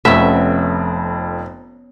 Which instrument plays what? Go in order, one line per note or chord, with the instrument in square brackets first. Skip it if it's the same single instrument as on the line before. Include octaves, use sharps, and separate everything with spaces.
[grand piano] F1 [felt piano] F2 [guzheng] B3 C#4 [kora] E5